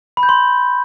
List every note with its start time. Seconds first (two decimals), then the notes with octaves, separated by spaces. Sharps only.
0.17 B5
0.23 G6
0.29 C6